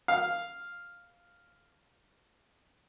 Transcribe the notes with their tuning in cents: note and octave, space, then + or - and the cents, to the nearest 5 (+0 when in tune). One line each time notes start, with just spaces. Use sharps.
F5 +0